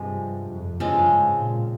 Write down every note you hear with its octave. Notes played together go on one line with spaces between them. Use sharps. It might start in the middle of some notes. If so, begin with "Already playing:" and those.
Already playing: G2 C3 F3 G#3
F2
G2 C#3 F3 G#3 C4
G#2
A#2